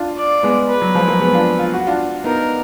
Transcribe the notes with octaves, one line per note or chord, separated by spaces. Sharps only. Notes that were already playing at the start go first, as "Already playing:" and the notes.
Already playing: D4 F4
D5
G#3 B3
B4
F#3
F3 G#3
F#3 A#3
G#3 B3
D4 F4
F4
F#4
D4 F4
B3 D#4 A#4